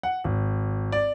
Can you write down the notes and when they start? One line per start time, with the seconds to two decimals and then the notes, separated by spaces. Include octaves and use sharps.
0.03 F#5
0.24 G#1
0.92 D5